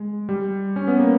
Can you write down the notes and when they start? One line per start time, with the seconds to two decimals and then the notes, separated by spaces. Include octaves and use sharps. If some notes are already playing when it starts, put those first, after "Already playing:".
Already playing: G#3
0.29 G3
0.76 C#4
0.87 B3
0.99 A#3